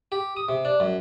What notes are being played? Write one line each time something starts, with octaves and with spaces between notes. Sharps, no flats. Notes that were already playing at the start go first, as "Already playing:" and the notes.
G4
D#6
C3
D4
F#2